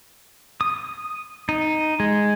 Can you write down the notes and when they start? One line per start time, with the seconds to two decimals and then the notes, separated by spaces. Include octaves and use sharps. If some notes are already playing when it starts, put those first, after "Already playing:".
0.61 D#6
1.49 D#4
2.00 G#3